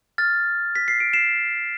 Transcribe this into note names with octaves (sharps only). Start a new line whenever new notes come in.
F6 A6
B6
C7
D7
C7 E7